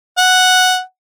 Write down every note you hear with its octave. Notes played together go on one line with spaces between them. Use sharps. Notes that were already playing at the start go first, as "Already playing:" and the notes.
F#5